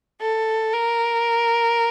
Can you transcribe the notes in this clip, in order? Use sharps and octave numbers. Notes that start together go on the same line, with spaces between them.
A4
A#4